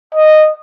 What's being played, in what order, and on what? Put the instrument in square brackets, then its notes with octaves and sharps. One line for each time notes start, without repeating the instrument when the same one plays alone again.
[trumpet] D#5